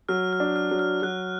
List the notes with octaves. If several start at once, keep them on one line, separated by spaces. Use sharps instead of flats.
F#3 F6
F6
D4
F6
F#3
F6
F#3 F#6